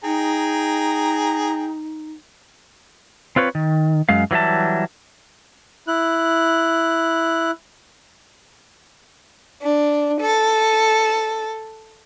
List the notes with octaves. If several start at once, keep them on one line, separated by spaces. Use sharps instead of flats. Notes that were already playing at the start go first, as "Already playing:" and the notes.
D#4 G#4 G5 A#5
C4 F4 B4 C#5
D#3
F#2 G#3 F5
E3 F#3 G3 E5 A5
E4 F#6
D4
A4